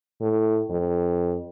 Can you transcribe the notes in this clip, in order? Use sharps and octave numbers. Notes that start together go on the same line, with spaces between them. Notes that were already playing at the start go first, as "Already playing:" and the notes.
A2
F2